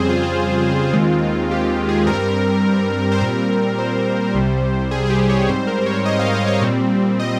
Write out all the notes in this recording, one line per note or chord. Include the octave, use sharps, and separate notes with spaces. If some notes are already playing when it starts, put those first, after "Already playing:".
Already playing: F2 C#3 G3 C4 G#4 C5
F4
F4
D#2 D#3 G#3 C4
G4
G4
G#4
G2 G3 C4 A#4
C5
A#2 G3 C4 A#4
C5
C2 C3 G3
G#4
G#4
G4
C#5
G#2 G3 C4 C5
A#4
C5
C#5
D#5
F5
D#5
C#5
A#2 G3 C4
D#5